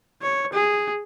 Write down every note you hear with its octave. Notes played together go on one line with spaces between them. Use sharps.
C#5
G#4